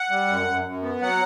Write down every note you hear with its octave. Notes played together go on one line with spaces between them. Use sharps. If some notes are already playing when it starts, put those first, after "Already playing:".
Already playing: F#5
G3
F#2
F#2
F#2
B3
F#3 F#5